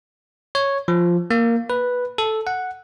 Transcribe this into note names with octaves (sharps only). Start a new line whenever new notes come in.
C#5
F3
A#3
B4
A4
F#5